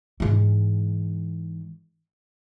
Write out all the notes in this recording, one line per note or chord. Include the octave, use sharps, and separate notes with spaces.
G#2 E3